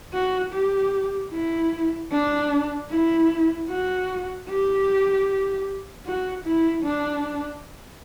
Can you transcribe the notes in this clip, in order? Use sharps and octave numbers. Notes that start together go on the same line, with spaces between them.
F#4
G4
E4
D4
E4
F#4
G4
F#4
E4
D4